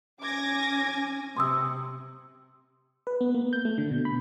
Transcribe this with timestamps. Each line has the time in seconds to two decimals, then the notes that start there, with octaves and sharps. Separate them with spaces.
0.21 C#4 G#5 D6 G#6 A#6
1.37 C3 C6 D#6 E6
3.07 B4
3.21 B3
3.34 A#3
3.53 G6
3.65 A3
3.78 D3
3.91 B2
4.05 B5